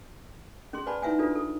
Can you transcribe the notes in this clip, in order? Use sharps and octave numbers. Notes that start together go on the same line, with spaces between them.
C#4 G#4 C6
B4 D5 F#5 G#5 A5 B5
D#4 E4 B4 E5 F#5 G#5
D4 F4 F#4 A4 B4
A4